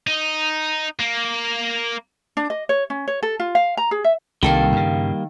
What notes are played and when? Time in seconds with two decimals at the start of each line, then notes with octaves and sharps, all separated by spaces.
0.07 D#4
1.00 A#3
2.37 D4
2.50 D#5
2.69 C#5
2.90 C#4
3.08 C#5
3.23 A4
3.40 F4
3.55 F5
3.77 A#5
3.91 G#4
4.04 E5
4.43 C2 D#3 G3 A#3 A4 F5
4.72 G2 C#3